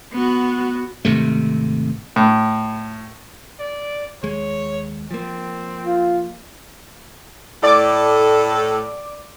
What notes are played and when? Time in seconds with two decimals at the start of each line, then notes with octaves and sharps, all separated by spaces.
0.12 B3 F#4
1.05 G#1 C3 A3
2.16 A2
3.59 D5
4.23 D#2 G#3 C#5
5.11 F3 A#3 C4
5.83 F4
7.63 A2 A4 D5 D6